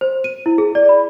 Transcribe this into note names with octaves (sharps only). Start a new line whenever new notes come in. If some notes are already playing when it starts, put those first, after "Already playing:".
C5
D#7
E4
G#4
D5
B5